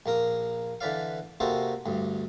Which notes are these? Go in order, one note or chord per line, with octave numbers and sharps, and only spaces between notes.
A#1 A#3 A#4 D#6
D3 E3 B4 D5 F5
C3 A#3 F#4 A4 C5 D#5
D2 G2